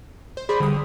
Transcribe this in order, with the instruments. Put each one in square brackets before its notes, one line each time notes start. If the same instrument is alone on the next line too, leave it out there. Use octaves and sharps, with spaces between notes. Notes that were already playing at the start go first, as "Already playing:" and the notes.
[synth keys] C5
[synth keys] G#4 [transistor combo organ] C5 D5 B5
[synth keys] D3 D#6 [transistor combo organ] G3